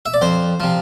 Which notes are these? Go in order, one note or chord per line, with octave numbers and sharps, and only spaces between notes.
E5
D5
F2 C5
C3 F3